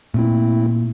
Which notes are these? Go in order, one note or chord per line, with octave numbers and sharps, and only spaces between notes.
A#2 A3 C4 E4